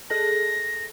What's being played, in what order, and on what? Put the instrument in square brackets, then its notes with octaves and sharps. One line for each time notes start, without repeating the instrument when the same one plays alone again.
[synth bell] G#4 A4 A5 [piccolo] A#6